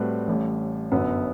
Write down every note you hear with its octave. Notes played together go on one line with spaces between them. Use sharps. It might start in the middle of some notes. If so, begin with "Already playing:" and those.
Already playing: A2 G3 C4 F#4 B4
A1 A2 G3
G1 F#2 F#3 B3